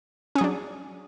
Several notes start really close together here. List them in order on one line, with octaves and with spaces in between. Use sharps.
C#4 G#4 F#3 D4